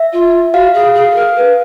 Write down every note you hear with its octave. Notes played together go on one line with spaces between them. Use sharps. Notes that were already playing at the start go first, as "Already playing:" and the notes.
Already playing: E5
F4
F#4 F5
G#4
G#4
A4
A#4
B4